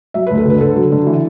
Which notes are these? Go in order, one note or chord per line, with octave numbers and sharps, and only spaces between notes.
F#3 E5
B4
D2
A4
D3 B4
D3 A4
F#3
D3
E3